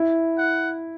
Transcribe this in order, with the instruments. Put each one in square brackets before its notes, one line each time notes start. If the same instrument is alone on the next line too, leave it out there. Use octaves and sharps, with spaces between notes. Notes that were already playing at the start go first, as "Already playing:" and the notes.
Already playing: [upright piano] E4
[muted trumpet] F#5